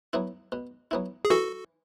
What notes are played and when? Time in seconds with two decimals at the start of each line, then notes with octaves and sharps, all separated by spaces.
0.13 F#3 B3 E4
0.52 B2
0.91 F#3 B3 E4
1.25 G#4
1.30 E3 F#4 A4